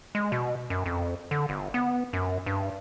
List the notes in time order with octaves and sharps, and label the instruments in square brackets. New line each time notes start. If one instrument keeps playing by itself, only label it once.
[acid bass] G#3
B2
F#2
F2
D3
G1
B3
F#2
G2